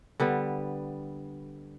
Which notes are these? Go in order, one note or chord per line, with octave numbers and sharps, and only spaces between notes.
D3 G3 B3